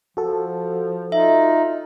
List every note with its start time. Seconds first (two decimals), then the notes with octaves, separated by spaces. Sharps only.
0.17 F3 F#4 A4
1.12 D#4 F4 E5